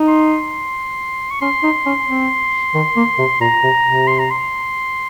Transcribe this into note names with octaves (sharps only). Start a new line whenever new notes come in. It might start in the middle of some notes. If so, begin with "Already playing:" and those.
Already playing: D#4
C6
C#6
C#4 C6
D#4
C#4
C4
D#3
A#3
C3
A#2 A#5
C3
C3
C6
A#5
C6